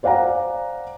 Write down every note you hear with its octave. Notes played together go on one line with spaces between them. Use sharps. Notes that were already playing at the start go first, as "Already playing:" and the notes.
C5 D5 F5 F#5 G#5 A#5